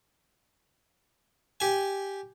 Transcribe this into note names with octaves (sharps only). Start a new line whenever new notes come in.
G4 G#5